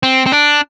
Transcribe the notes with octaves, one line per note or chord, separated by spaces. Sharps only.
C4
C4
D4